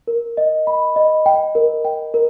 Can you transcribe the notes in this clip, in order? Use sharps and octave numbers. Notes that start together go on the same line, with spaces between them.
A#4
D#5
B5
D#5
G5
A#4
G5
A#4